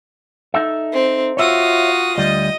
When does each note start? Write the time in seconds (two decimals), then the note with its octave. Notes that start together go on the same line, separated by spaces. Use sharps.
0.54 D#4 A4 E5
0.91 C4
1.37 F4 F#4 C#5 E5 D#6
2.18 D2 G3 D#5 D#6